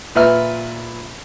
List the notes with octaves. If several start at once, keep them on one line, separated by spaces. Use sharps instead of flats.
A#2 B4 E5 F6